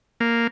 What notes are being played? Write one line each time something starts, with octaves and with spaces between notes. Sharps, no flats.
A#3